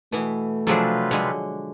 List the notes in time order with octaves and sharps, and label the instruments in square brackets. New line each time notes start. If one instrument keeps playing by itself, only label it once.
[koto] B2 E3 [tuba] A3
[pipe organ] C3 F4 B4 [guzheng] F3 G#4 A4 [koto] F#3 D4
[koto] D3 [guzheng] G#3 C#5